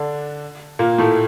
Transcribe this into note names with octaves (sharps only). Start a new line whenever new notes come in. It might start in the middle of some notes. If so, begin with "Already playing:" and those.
Already playing: D3 D4
A#2 A#3
A2 A3